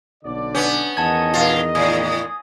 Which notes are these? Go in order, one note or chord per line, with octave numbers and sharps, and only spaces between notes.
B1 D3 D5
B3 C#4 D4
E2 D#3 D#5 F#5 A5 G#6
A#2 F4
A2 D#6 G#6